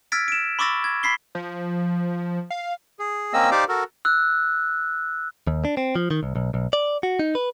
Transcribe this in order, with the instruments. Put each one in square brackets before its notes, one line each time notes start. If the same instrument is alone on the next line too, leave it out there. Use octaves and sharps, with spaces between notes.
[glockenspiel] E6 F6 G#6 A6 B6 D7
D7 E7
B5 C#6 D6 E6 A6 A#6
G#6
B5 B6 C7 G7
[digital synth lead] F3
F5
[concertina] G#4
A#3 C4 C#4 D#5 E6
D#4 G4 C5 D5 F5 D6
F#4 A4 A#4
[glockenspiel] E6 F#6
[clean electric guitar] D#2
D4
C4
F3
D#3
C2
B1
B1
D5
F#4
D#4
B4